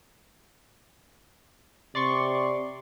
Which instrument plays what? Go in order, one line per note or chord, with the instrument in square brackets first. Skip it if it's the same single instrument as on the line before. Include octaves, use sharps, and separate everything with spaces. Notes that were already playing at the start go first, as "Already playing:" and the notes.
[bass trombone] C3 [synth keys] D5 C6 C#6